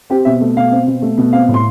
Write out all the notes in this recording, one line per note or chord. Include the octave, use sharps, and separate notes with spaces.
C4 G4
B2 E5
A3
B2 F5
C4
B2
A3
B2
C4 F5
A2
C6